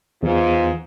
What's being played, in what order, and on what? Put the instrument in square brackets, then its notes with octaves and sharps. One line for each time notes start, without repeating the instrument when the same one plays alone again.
[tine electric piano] E2 [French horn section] G#2 F4